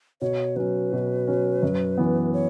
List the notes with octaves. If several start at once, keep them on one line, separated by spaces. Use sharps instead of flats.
B2 C#5
F#3 C#4 B4
B2
F#3 C#4
F#2
E3 B3
C#5